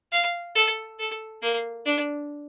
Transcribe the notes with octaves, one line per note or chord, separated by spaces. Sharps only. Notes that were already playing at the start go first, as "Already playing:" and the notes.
F5
A4
A4
A#3
D4